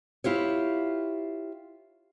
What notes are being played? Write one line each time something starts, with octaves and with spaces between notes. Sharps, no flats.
E4 F4 G4 C#5